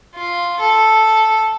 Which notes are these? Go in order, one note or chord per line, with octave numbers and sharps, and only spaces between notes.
F4
A4